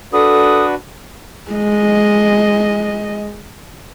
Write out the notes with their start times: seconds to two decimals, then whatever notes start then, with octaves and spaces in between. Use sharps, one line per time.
0.13 D4 F#4 A4 B4 D#6
1.51 G#3 D#5